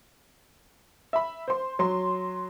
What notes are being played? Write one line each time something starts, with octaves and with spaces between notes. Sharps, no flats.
E5 B5
C5 C6
F#3 C6